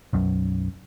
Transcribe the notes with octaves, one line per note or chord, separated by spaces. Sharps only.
B1 F#2